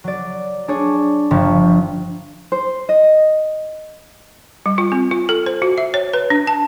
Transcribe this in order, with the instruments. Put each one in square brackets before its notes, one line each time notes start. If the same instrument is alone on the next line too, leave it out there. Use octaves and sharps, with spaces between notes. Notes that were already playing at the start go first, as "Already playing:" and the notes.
[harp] F#3 D5
D4 G#4 C#5
G1 F3 C#6
[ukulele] C5
D#5
[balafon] G3
F4
C4
F4
A4
C5
F#4
E5
C#5
B4
D4
A5